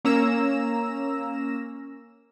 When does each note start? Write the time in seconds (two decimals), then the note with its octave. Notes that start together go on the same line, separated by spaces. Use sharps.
0.05 A#3 C#4 A#5 E6 E7